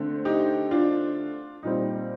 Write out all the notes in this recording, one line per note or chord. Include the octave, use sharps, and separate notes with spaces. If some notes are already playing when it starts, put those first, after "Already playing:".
Already playing: D3 A3 C4
D#4 G4
D4 F4
A#2 G3 C4 D#4